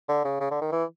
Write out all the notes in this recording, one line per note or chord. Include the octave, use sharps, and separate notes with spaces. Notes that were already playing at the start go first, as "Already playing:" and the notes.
D3
C#3
C#3
D3
D#3
E3